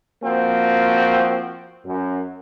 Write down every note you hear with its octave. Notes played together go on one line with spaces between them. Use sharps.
F3 A#3 C4 F#4
F#2